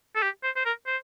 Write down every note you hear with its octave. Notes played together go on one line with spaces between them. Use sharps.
A4
G4
C5
C5
A#4
C5